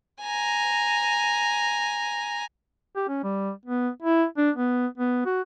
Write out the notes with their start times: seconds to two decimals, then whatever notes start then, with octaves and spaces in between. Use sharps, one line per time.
0.22 G#5 A#5
2.96 G4
3.09 C#4
3.23 G3
3.66 B3
4.02 E4
4.37 D4
4.56 B3
4.98 B3
5.26 F#4